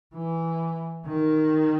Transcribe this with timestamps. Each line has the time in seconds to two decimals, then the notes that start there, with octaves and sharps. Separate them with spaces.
0.14 E3
1.06 D#3